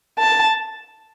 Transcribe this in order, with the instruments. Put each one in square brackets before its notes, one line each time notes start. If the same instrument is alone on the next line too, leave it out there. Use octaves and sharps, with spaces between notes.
[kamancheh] A5